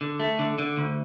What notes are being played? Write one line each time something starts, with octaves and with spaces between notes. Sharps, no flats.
D3
A3
D3
D3
D2